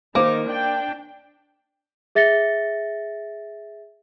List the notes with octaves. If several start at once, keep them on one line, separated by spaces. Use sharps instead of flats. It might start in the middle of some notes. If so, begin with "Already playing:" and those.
D#3 A#3 D#4 C5 D6
D4 G5
G#4 E5 A6 A#6 C#7 G7